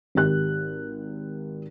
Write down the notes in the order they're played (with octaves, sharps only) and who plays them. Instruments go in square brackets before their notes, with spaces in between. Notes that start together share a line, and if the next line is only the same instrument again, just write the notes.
[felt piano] G#1 G4 F#6